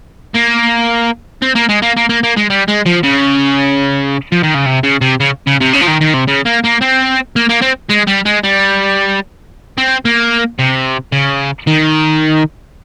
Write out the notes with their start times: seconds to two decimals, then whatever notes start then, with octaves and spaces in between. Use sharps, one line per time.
0.35 A#3
1.42 C4
1.56 A#3
1.69 G#3
1.82 A#3
1.97 A#3
2.09 A#3
2.23 A#3
2.37 G#3
2.50 G3
2.68 G#3
2.86 F3
3.04 C#3
4.32 F3
4.43 D#3
4.55 C#3
4.66 C3
4.83 C#3
5.01 C3
5.20 C#3
5.47 C#3
5.61 C3
5.73 C#3
5.81 F3
5.88 D#3
6.01 D#3
6.14 C3
6.27 C#3
6.45 A#3
6.64 A#3
6.81 C4
7.36 A#3
7.49 A#3
7.62 C4
7.90 G#3
8.07 G3
8.26 G#3
8.44 G3
9.78 C4
10.05 A#3
10.59 C3
11.12 C#3
11.67 D#3